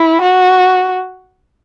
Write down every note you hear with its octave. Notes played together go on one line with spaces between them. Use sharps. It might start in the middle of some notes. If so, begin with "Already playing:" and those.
Already playing: E4
F#4